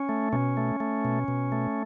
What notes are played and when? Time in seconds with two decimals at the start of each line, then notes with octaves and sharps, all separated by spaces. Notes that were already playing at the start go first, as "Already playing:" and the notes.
Already playing: C#4
0.09 A3
0.33 B2 C#4
0.57 A3
0.80 A3
1.05 B2
1.28 B2
1.52 A3